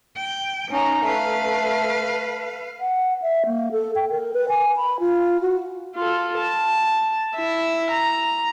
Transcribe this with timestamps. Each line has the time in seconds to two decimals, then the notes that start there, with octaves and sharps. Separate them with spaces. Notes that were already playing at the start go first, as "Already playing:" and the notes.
0.17 G5
0.71 C#4 D#4 A#5
1.05 A3 B4 F5
2.80 F#5
3.22 E5
3.46 A#3
3.72 A4
3.95 G5
4.10 A#4
4.34 B4
4.49 G#5
4.77 B5
5.00 F4
5.41 F#4
5.95 F4 A4
6.38 A5
7.35 E4 E5
7.91 A#5